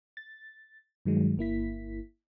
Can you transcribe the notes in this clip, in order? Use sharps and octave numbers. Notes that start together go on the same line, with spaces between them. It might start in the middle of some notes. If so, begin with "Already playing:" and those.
A6
G2 D#3 F#3 G#3
G1 A#3 E4 B6